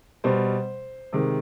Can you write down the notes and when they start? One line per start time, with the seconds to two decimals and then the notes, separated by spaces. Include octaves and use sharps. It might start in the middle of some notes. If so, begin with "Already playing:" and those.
0.24 B2 G3 C5
1.13 C3 D#3 G#3